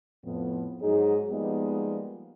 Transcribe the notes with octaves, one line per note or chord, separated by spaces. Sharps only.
F2 A2 F3 B3
G#2 F#3 D#4 G#4
F3 G3 G#3 A#3 B3 D#4